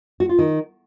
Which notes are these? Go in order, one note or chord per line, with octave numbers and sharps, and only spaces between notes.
F#4
F4
D#3